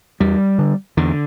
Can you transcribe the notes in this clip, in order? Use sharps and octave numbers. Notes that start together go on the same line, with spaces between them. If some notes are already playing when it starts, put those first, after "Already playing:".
E2 G3
D3
E2 D3